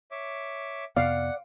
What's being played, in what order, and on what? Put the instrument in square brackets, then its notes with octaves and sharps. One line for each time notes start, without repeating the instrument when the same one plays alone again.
[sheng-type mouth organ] C#5 E5 D6
[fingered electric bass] F2 C3 B3 [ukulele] D5 [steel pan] F5 [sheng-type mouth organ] F#5